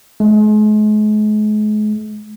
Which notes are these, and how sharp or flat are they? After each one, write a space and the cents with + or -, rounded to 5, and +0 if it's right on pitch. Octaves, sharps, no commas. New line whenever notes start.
G#3 +40